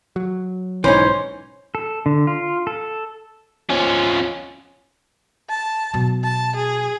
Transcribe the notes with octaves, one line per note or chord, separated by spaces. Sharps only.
F#3
B1 G#2 E3 C#4 D#4 C5 C#5
A4
D3
F4
A4
F3 C#4
A5
B2 F#3
A5
G#4